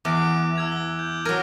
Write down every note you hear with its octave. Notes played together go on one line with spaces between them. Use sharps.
E2 D6 F#6 D7
E6 G#6 F7
G7
G6
F#3 A#4 G#6 D7 D#7